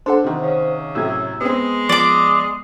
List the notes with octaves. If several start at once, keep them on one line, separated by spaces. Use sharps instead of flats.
D4 A4 C5 F#5
C3 D#3
C#3
F#2 A2 C3 E6 G#6
G#3 B3 C4
F3 D5 D6